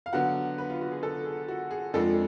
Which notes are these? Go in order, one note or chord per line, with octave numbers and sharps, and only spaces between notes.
F5
D3 F#3 B3 F#5
B4
F4
F#4
G#4
A4
G#4
F#4
G#4
F2 F3 G#3 D4 A4